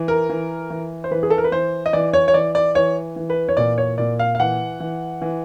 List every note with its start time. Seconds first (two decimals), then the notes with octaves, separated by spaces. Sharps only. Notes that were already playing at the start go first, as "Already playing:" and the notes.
Already playing: E3
0.08 A#4
0.30 E3
0.70 E3
1.04 C5
1.11 E3 B4
1.23 G#4
1.30 A4
1.38 A#4
1.44 B4
1.52 E3 C5
1.86 D#5
1.93 E3 D5
2.13 C#5
2.28 C#5
2.34 E3 D5
2.55 D5
2.75 E3 C#5
3.16 E3
3.30 B4
3.49 C#5
3.57 A#2 D5
3.78 C#5
3.98 A#2 D5
4.19 F5
4.35 F5
4.39 E3 F#5
4.80 E3
5.22 E3